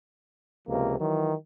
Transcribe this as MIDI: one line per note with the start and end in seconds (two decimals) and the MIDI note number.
0.68 0.96 37
0.68 0.96 48
0.68 0.96 53
0.68 0.96 58
0.99 1.32 51
0.99 1.32 52
0.99 1.32 54